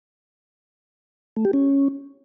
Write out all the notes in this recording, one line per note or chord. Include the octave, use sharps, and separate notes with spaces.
A3
G4
C#4